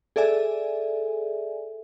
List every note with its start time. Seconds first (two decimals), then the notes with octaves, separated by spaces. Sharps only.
0.16 G#4 A4 D5 E5 G#5